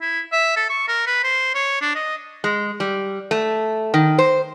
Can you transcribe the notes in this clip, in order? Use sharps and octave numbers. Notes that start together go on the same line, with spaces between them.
E4
E5
A4
C#6
A#4
B4
C5
C#5
D4
D#5
G#3
G3
A3
D#3
C5